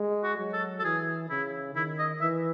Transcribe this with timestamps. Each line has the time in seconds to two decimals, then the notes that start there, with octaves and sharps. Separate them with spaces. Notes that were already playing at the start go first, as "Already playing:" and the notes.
Already playing: G#3
0.24 F#4
0.39 F#3
0.53 A4
0.80 A4
0.84 E3 G#4
1.30 C#3 E4
1.75 D#3 E4
1.99 D#5
2.21 E3 E5